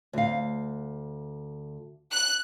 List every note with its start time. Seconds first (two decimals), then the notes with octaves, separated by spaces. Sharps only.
0.13 D2 F5
2.11 F#6